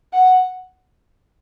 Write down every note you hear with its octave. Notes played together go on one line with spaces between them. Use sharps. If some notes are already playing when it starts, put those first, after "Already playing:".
F#5